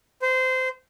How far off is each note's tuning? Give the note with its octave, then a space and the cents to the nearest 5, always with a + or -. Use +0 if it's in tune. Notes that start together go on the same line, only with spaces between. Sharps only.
C5 -20